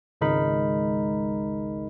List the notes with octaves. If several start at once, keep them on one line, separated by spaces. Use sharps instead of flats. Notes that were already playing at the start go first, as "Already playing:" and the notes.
G#1 C#2 G#3 D#4 A#4 B5